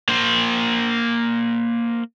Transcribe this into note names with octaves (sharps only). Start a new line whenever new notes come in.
A#3 C5